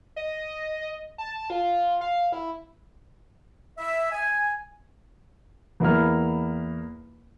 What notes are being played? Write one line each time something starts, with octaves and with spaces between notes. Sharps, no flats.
D#5
A5
F4
F5
E4
E5
G#5
E2 A#3 E4 F6